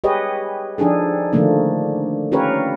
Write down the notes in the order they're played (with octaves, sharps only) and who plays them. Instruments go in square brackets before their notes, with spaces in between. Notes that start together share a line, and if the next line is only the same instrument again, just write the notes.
[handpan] G4 G#4 B4 C#5 D#5
F3 D4 D#4 G#4 A4
D3 D#3 F3 A3 A#3 D4
C#4 F4 G4 A#4 B4 C#5